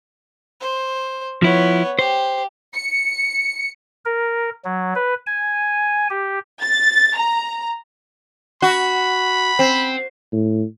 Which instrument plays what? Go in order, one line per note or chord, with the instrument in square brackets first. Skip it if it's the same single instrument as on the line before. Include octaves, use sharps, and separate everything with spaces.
[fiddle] C5
[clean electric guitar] F3 E4 [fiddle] B3 C#5
[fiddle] G4 [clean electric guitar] C5
[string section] C#7
[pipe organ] A#4
F#3
B4
G#5
G4
[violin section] A6
A#5
[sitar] F#4 [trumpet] B5
[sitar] C4
[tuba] A2